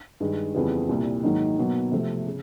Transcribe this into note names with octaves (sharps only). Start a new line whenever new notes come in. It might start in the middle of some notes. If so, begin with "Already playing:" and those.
G2 D#3 G#3
F2 C#3 E3 G3 B3
C2 A#2 G3
G#2 D#3 F#3 A#3 D#4
B2 F#3 A#3
C3 F3 A3 C4
C#3